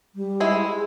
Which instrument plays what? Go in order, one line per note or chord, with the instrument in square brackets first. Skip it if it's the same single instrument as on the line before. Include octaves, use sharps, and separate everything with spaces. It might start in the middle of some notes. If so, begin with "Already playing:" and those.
[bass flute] G3
[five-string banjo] G#3 E4
[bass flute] G#4